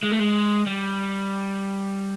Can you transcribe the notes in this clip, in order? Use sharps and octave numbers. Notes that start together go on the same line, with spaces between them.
G#3
A3
G#3
G3